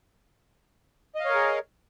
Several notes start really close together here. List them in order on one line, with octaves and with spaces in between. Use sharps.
D#5 F5 C#5 A#4 G#4